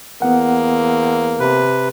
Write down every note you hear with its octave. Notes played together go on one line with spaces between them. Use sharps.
E2 A#3 B3 F#5
C3 B4